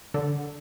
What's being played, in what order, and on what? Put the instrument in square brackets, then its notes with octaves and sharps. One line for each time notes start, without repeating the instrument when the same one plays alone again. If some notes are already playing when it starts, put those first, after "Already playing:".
[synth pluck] D3